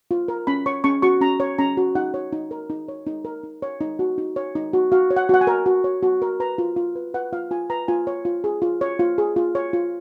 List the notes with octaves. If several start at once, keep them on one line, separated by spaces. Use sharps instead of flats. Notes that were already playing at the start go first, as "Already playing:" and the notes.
F4
A#4
C#4 B5
C#5 C#6
C#4 C#6
F#4 C#6
C#4 A#5
C#5
C#4 A#5
F#4
D#4 F#5
C#5
D#4
A#4
D#4
C#5
D#4
A#4
D#4
C#5
D#4
F#4
D#4
C#5
D#4
F#4
F#4 F5
C#5
F#5
F#4 F#5
G#5
A#4
F#4
C#5
F#4
A#4
B4 A#5
F4
F4
B4
B4 F#5
F4 F5
F4 G#5
B4 A#5
F4 G#5
C#5
F4
G#4
F4
C#5
F4
G#4
F4
C#5
F4